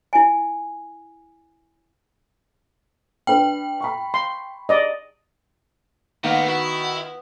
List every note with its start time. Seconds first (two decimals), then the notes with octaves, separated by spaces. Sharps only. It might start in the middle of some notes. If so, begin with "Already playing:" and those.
0.13 E4 G#5
3.27 D4 B4 G5
3.81 B5 C#6
4.14 C6
4.69 D5 D#5
6.24 A2 D#3 A#3 B3
6.48 E4 F#4